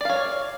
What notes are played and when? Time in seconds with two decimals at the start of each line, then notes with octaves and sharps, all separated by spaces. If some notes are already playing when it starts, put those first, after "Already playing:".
0.01 D5
0.05 F5
0.09 C#5